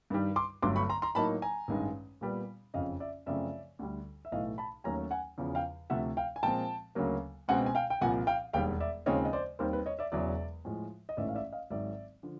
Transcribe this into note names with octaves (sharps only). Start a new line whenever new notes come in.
G2 D#3 G3
C6 D6
G1 G2 D3 F#3 A3 C6 D6
B5 C#6
A#5 C6
A#5 C6
A2 F#3 A#3 D#4 A5 B5
G#5 A#5
A1 G2 D#3 G#3
A#2 G3 B3
F#1 F2 C#3 D#5 F5
D5 E5
F#2 C#3 F3 A3 C4 D5 E5
D2 D3 G3
E5
B1 A2 E3 A3 D#5 F5
A5 B5
D#2 D#3 F#3 A3 C#4 G#5 A#5
F#5 G#5
E2 C#3 F3
F5 G5
D2 C3 F3 A3 E5 F#5
F5 G5
G#5
A#2 F3 G#3 C4 G5 A5
D2 C#3 F#3 A#3
C#2 B2 G#3 C4 F#5 G#5
G#5
F5 G5
G5
C2 A#2 F3 F#5 G#5
F5 G5
E1 D#2 D#3 G3 F5 G5
D5 E5
D#2 C#3 F3 G#3 C4 C#5 D#5
D#5
C5 D5
D#2 D#3 G3 C4 A#4 C5
B4
C#5 D#5
D5 E5
E1 E2 C#3 F#3 D5 E5
A2 F3 G#3
D#5
A1 G#2 E3 A3 D5 E5
F5
D5 E5
D#5 F5
G#1 G#2 D#3 F#3 D5 E5
D3 F3